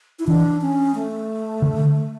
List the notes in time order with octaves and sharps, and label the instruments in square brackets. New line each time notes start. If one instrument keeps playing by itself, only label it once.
[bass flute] E4
[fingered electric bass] E3 [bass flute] D4
[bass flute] C#4
A3
[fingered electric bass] D3